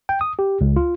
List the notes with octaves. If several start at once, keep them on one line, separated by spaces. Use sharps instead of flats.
G5
D#6
G4
C#2
F4